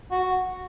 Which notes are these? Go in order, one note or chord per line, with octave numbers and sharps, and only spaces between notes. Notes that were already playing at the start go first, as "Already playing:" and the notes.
F#4